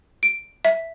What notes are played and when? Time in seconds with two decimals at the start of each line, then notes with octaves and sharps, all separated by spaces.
0.23 D7
0.65 E5